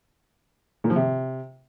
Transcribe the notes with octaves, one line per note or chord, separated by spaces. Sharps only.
A#2
F3
C3